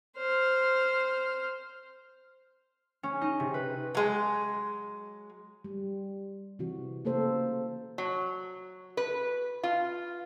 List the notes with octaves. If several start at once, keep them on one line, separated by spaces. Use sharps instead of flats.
C5 F6
C#4
D#4
C3
B4
F#3 G#3
G3
C3 E3 F#4
C#3 A#3 A4 C5
F#3
B4
F4